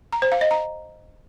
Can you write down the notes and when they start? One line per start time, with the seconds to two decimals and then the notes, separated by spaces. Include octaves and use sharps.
0.13 A#5
0.22 C5
0.32 F5
0.41 D#5
0.51 A#5